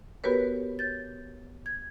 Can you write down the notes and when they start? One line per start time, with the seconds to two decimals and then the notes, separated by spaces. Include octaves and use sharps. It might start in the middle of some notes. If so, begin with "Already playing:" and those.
0.24 B3 F#4 G4 A#4 B4 C#5
0.79 C#5 G6 A6
1.66 G#6